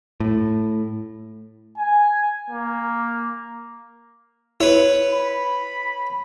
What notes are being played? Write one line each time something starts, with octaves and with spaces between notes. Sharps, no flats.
A2
G#5
A#3
E4 B4 C#5
B5